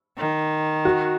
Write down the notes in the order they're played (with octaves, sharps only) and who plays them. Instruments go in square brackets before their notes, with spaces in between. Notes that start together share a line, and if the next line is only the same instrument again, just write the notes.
[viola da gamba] D#3
[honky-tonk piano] F#4